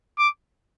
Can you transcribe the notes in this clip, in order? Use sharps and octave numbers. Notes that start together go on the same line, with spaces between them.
D6